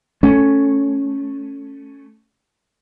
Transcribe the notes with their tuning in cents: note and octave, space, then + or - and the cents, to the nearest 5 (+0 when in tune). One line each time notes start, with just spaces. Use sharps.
A3 +0 C#4 +0